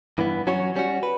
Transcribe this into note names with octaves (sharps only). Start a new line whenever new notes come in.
G2 E3 B3
F#3 C#4 F#4 C#5
G3 C#4 F#4
B4